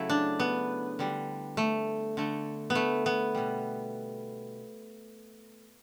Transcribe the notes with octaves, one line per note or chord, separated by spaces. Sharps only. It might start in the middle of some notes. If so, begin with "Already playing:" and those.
Already playing: C#3 F#3 A3 E4
D4
B3
D3 G3
A3
D3 A3
B3
A3
B3
B2 G3